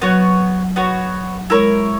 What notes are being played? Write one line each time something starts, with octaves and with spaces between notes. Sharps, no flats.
F#3 B3 F#4 C#5
B3 F#4 C#5
G#3 E4 A#4 C#5